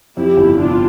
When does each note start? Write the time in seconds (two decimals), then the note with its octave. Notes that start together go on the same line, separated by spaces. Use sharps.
0.17 F2 E4 G4
0.37 G1
0.57 C3 D4 F4